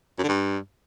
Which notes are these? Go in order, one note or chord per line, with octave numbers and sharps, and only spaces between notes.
F#2
D3
G2